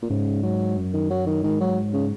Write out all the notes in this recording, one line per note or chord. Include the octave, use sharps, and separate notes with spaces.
A#2
G#2 C#3
F#3
F#2
D#3
F#3
D#3
G#2 D#3
F#3
C#3